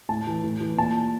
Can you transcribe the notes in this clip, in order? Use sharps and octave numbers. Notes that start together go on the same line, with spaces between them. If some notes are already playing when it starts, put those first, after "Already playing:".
A2 A5
E3
A2
E3
A#2 A5